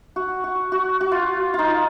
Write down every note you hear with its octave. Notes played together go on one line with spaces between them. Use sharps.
F#4
F#4
F#4
F#4
F4
D#4 F4